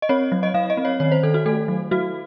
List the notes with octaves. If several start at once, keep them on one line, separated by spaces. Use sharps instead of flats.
D#5
C4 C#5
F#3
D#5
F#3 F5
D#5
C4
C#5
D#3 C#5
C5
D#3 A4
F#4
A3 A4
F#3
F#3 F#4